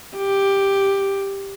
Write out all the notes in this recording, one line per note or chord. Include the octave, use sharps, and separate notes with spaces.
G4